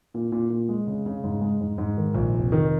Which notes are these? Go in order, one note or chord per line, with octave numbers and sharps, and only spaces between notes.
A#2
A#2
A#2
G#3
C#3
C#3
G#2
G#3
G#2
G#2
D#3
A#1
F1
D#3